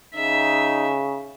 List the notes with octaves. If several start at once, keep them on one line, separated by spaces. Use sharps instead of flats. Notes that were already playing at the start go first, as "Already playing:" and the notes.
C#3 D#4 E5